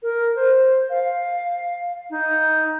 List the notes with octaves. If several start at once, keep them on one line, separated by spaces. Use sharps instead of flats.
A#4
C5
F5
D#4